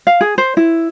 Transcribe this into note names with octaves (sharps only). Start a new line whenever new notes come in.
F5
G#4
C5
E4